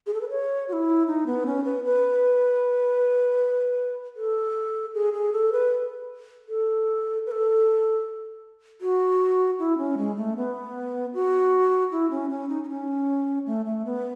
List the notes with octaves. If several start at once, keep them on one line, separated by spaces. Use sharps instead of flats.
G#4
A4
B4
C#5
F#4
E4
D#4
B3
C#4
B4
B4
A4
G#4
G#4
A4
B4
A4
B4
A4
F#4
E4
C#4
G#3
A3
B3
F#4
E4
C#4
C#4
D#4
D#4
C#4
A3
A3
B3